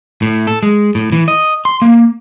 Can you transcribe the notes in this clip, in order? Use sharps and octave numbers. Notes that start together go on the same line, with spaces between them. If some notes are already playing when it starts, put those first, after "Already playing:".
A2
A4
G#3
A2
E3
D#5
C6
A#3